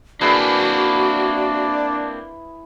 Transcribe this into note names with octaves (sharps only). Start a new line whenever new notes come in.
A#3 C4 D4 E4 F#4 G#4 B4